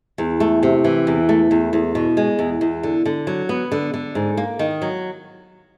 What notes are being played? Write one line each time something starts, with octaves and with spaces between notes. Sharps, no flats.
E2
A3
C3
E3
E2
A3
E2
E2
B2
G#3
E2
E2
D3
D3
F#3
B3
D3
D3
G#2
A#3
D#3
F#3